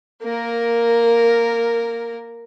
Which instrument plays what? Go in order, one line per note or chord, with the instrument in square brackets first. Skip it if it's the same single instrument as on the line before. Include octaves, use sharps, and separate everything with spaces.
[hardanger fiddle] A#3 A#4